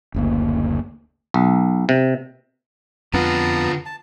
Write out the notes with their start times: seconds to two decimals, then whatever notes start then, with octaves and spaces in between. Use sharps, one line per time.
0.14 F#1 D2 A#3
1.34 B1
1.89 C3
3.14 F2 D3 B3 F4 A5 A#5
3.86 A5